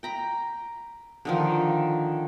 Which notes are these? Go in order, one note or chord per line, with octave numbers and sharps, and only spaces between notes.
G5 A#5 B5
D3 D#3 F3